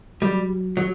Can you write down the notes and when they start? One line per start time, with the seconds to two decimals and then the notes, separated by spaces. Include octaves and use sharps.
0.22 F#3 G3
0.77 F#3